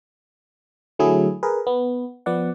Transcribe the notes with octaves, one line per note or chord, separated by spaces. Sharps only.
D3 F#3 A3 E4 G#4
G#4 A#4 B4
B3
F3 B3 D5 F#5